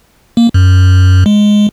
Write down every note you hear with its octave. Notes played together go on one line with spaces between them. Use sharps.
A#3
F#2
G#3